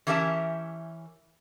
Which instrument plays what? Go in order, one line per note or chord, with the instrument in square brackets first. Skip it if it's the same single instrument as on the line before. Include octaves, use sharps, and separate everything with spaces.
[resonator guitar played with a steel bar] E3 C#4 G4 A#4 E5 A5